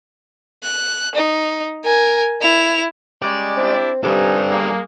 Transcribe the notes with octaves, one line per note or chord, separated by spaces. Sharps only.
F#6
D#4
A#4 G#5
E4 F7
C#3 G3 G#3 D5
C4 D4 E4 G4
G2 C3 G3 D#4 A4 G#5
G#3 A#3